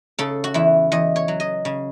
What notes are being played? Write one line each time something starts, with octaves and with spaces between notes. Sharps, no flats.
C#3 A4
F#4
E2 E4
E2 D#5
C#5
F#3
D#5
C#3